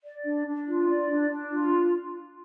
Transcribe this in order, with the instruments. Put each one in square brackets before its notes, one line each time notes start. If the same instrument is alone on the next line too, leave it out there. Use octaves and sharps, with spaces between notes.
[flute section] D5
D4
D4
F4
D5
D4
D4
F4